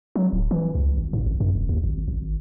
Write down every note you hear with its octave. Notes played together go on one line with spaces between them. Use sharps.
F#3
D1
E3
C#2
G#1
G#2
G#1
F#2
F1
D#2
G#1
G#1